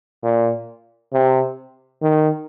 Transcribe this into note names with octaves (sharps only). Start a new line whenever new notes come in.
A#2
C3
D#3